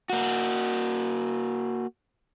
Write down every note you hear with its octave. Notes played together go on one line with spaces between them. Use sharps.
A#3 F#4